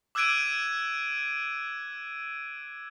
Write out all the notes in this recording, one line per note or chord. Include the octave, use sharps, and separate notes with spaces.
D6 E6 F#6 G#6 D7 D#7